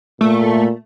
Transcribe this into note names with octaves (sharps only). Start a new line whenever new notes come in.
A#2 A3